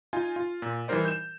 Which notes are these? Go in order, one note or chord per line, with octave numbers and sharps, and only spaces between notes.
D#4 F4 G#5
F4
A#2
E3 G3 D#4 A#4 C5 D5
G6 E7